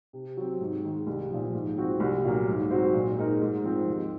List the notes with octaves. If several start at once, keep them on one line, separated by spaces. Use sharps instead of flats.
C3
F#3 C4
G#2
D#3 G#3
C2
A#2 F3
G#2
F3 C4 F#4
C2
A#2 F#3 A#3
G#2
F#3 C4 F#4 C5
A#2
G#3 D#4 A#4
G#2
F3 C4 F4
D#2